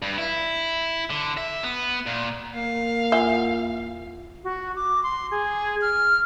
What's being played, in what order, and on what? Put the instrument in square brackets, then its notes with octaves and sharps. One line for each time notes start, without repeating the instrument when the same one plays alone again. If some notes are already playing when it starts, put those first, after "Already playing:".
[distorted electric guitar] G2
E4
D3
E5
B3
A#2
[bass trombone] A#3 [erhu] F5
[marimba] E2 F4 F#5 [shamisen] E5
[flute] F#4
D6
C6
G#4
F6